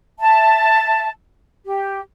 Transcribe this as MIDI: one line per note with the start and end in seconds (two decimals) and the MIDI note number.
0.19 1.09 76
0.19 1.09 81
1.66 2.00 67